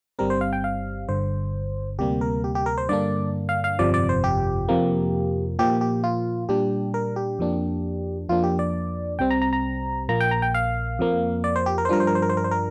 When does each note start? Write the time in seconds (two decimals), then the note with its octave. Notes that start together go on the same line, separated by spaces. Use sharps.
0.19 G1 G2 G3 C4 A#4
0.30 C5
0.41 F5
0.53 G5
0.64 F5
1.09 G1 G2 D3 C5
1.99 D2 C3 G3 A#3 G4
2.21 A#4
2.44 G4
2.55 G4
2.66 A#4
2.78 C5
2.89 G2 D3 A#3 D4 D5
3.49 F5
3.64 F5
3.79 G1 F2 C3 F3 D5
3.94 D5
4.09 C5
4.24 G4
4.69 F2 C3 F3 A#3
5.59 A#2 F3 A#3 G4
5.81 G4
6.04 F4
6.49 A#2 G3 D4 G4
6.94 A#4
7.16 G4
7.39 F2 F3 A#3 D4
8.29 F2 F3 A#3 D4 F4
8.44 G4
8.59 D5
9.19 C2 C3 G3 C4 G5
9.31 A#5
9.42 A#5
9.53 A#5
10.09 A#1 A#2 A#3 A#5
10.20 G5
10.31 A#5
10.42 G5
10.54 F5
10.99 F2 F3 A#3
11.44 D5
11.56 C5
11.66 G4
11.78 A#4
11.85 C5
11.89 G2 F3 D4 A#4
12.00 C5
12.07 A#4
12.15 C5
12.22 A#4
12.29 C5
12.37 A#4
12.44 C5
12.51 A#4